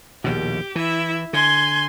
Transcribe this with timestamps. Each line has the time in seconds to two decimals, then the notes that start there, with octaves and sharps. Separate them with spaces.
0.24 A#1 D#2 B2 G4
0.75 E3 E4 E5
1.33 D3 G#5 C6 G6